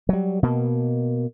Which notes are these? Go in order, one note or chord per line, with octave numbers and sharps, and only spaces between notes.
F#3 G3
B2 A#3